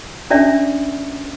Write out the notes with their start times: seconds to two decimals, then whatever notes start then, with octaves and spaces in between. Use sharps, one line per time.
0.30 C#4 D4 D5 E5